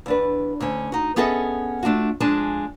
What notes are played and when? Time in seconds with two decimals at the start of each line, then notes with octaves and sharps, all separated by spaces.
0.06 E2 D4 B4
0.60 D2 C#4
0.92 D#4 F#4
1.16 B3 C#4 G#4 A4 D#5 E5
1.83 A3 D4 F4 F#4
2.20 F2 G#3 D4 G#5 A5